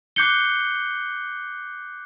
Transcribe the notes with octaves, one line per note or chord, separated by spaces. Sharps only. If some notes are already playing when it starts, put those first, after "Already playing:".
D6 F#6 G6 C7 C#7 G7